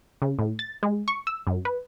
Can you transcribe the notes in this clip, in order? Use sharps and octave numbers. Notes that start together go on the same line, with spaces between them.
C#3
A2
A6
G#3
C#6
E6
F#2
B4